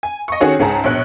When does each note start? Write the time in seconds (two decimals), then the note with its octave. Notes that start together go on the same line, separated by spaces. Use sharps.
0.03 G#5
0.28 D#5 C#6
0.41 D#3 C#4 F#4 G#4 A4 C#5
0.59 C#2 G#2 G#4 C#5 A5 A#5
0.84 A#1 B2 C#5 F#6